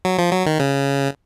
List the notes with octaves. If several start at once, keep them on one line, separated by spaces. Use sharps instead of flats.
F#3
F3
F#3
D#3
C#3